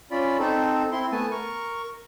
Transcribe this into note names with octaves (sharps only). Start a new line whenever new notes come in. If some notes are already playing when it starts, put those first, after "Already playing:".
C#4 F4 D5 B5
C4 D#4 A4
C4 E4 C6
A3 B3 G#5 A5
A#4 C#6